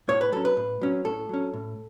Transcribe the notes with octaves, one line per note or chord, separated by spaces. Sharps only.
A2 C#5
B4
F#3 C#4 A4
B4
A2
F#3 C#4
A2 A4
F#3 C#4
A2